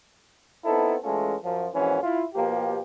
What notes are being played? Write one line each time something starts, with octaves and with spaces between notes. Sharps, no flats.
B3 C4 D#4 E4 A4
E3 G#3 A3 C#4 F4 A4
F#2 F3
A#1 F2 G#2 E3 C#4 F#4
E4 F4
B2 F3 A#3 G4